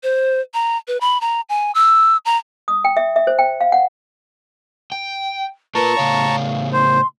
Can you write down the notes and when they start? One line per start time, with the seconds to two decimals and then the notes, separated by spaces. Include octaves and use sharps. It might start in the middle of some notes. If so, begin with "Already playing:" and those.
0.03 C5
0.54 A#5
0.88 B4
1.01 B5
1.21 A#5
1.49 G#5
1.75 E6
2.25 A#5
2.68 D#6
2.85 G5
2.97 E5
3.16 E5
3.27 C5
3.39 G5
3.61 F5
3.72 F#5
4.92 G5
5.75 F4 A#4 B4 A5 A#5 C#6
5.97 A2 C#3 C#5 F5
6.73 C5 C6